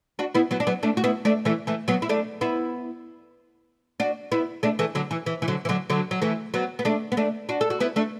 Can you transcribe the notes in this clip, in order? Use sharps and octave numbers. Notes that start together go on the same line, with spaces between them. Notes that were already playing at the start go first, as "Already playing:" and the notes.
D4 F#4
B3 E4
F#3 B3
D4
F#3 B3
A3 D4
F#4
B3 E4
A3 D4
E3 A3
E3 A3
F#3 B3
E4
A3 D4
B3 E4
D4 F#4
B3 E4
A3 D4
E3 A3
D3 F#3
E3
E3
E3
D3 F#3
E3
D3 F#3
D3 F#3
F#3
E3 A3
F#3 B3
B3
A3 D4
B3
A3 D4
D4 F#4
A4
F#4
B3 E4
A3 D4